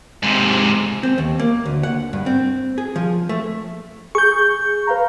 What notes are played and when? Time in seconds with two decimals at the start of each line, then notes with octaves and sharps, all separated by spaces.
0.23 G#2 C3
1.03 C4
1.18 D#2
1.39 A#3
1.66 D2
1.83 F#5
2.13 G2
2.26 C4
2.78 G#4
2.96 F3
3.29 A3
4.15 G#4 C#6 G6
4.87 B4 F5 A#5